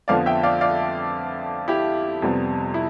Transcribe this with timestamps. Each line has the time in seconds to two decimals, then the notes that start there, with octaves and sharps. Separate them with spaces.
0.08 F2 D3 F3 B3 D5 F5
0.26 E5 G5
0.43 D5 F5
0.61 D5 F5
1.68 E4 G4
2.22 F2 C3 G3 B3
2.74 E4